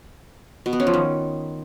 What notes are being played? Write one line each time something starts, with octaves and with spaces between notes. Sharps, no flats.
B2
B3
C#4
F3
D#3